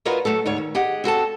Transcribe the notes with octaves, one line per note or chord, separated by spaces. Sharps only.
F4 F#4 A#4 B4 C#5 D#5
F#3 A3 F#4 A4
D2 G#2 C#5
D#3
G4 G#4 D#5 F#5
C4 F#4 A4 A5